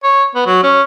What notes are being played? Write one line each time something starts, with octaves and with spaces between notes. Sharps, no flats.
C#5
B3
F#3
C#4